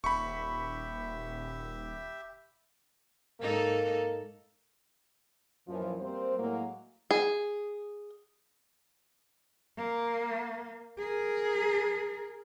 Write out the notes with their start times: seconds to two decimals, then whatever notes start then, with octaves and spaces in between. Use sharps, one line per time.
0.04 D#1 G4 E5 B5 C#6
3.40 G#2 A#3 D#4 A4
5.68 F#2 A#2 E3 F3
6.01 G3 A#3 C4 C5
6.39 A2 F#3 G#3 A#3
7.11 G#4
9.78 A#3
10.99 G#4 A#4